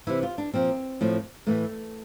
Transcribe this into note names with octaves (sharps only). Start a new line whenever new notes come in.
C3 E3 E4
F4
D4
A#2 F3 C4
A2 F3
A2 E3 A3